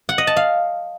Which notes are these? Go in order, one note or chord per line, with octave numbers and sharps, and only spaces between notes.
F#5
D#5
A5
F5